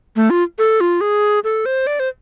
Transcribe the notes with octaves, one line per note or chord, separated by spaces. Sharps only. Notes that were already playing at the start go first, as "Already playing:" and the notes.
A3
F4
A4
F4
G#4
A4
C5
D5
C5